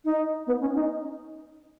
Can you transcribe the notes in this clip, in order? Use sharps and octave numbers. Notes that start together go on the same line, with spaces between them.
D#4
B3
C#4
D#4